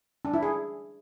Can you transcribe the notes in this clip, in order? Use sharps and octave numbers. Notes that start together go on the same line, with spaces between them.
D4
E4
G#4